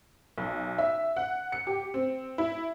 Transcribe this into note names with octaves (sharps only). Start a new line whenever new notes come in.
B1
E5
F#5
C#7
G4
C4
E4